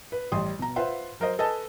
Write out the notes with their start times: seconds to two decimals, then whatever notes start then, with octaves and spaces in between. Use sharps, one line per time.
0.12 B4
0.32 A1 G3 C6 D#6
0.59 B2 A#5
0.76 F4 B4 C5 E5 F#5 C6
1.20 F#3 A#4 C5 D#5
1.39 A4 B4 D#5 G#5 A5